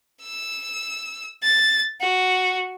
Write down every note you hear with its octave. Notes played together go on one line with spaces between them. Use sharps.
E6
A6
F#4